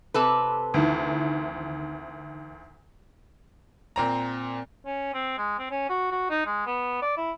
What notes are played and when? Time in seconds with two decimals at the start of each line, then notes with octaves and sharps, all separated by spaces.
0.14 C3 A4 B4
0.74 D2 D#3 E3
3.96 A#2 C4 A#5
4.86 C#4
5.14 C4
5.38 G#3
5.59 C4
5.71 C#4
5.89 F#4
6.11 F#4
6.30 D#4
6.46 G#3
6.66 B3
7.02 D5
7.17 E4